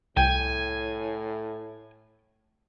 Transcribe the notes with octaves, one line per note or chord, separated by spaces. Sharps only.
C2 A2 G5 G#5